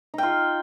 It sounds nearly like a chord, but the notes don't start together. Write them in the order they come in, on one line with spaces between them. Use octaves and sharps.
D#4 G5 F4